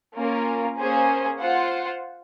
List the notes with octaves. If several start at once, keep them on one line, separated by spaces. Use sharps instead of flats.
A#3 C#4 F4 A#4
A#3 C#4 G#4 C5
F4 C5 F#5